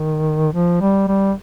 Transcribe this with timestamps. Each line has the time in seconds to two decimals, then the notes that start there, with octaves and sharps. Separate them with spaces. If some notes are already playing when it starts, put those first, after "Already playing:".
Already playing: D#3
0.53 F3
0.81 G3
1.08 G3